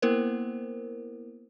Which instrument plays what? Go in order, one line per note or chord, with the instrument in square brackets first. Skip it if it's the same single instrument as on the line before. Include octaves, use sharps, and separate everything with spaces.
[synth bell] A#3 B3 E4 A#4 C5